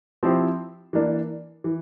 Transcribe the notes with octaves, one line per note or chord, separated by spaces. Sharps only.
F3 C4 E4 G4 C5
E3 A#3 D4
E3